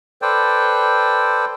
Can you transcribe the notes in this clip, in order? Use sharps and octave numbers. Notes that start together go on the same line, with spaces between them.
A4 B4 C5 D5 G5